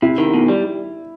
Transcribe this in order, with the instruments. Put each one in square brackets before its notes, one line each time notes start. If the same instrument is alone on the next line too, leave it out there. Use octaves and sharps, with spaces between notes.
[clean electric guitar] C3 [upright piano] E4
[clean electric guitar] D#3
B2
G3